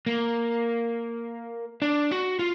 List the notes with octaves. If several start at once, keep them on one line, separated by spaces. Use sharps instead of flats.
A#3
D4
F#4
F4